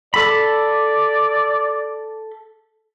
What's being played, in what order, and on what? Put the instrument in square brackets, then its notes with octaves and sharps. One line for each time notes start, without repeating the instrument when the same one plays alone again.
[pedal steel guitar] A4 B5 [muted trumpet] D5